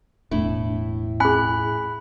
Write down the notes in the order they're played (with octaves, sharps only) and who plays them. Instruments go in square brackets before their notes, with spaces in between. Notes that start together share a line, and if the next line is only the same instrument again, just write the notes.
[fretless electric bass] E1 D4 [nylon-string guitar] A2 E4
[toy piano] G#4 G#5 [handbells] B5 F#6